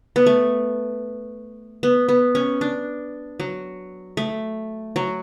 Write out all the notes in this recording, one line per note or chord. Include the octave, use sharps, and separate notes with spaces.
B3
A3
B3
B3
C#4
D4
F#3
A3
F#3